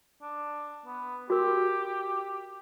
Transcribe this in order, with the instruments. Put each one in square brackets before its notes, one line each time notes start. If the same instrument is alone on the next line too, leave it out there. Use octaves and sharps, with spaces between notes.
[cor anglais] D4
B3
[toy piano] F#4 A#4 [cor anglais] G4